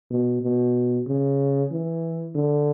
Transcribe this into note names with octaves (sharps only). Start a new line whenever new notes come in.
B2
B2
C#3
E3
D3